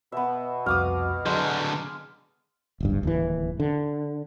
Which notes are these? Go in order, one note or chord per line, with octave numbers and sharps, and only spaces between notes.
B2 B3 E5
C2 F2 F#4 F5 D6 D#6
D3 F#3 G#3 D5 G#5 G6
D1 G1 G2
D1 D#2 D3 E3
D3